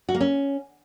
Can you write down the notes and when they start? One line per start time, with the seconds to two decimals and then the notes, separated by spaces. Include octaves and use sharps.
0.09 F#4
0.15 A#3
0.21 C#4